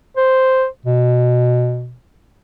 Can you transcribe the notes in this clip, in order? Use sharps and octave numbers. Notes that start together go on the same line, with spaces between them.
C5
B2